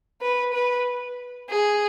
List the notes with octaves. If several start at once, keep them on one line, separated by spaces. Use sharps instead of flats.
B4
B4
G#4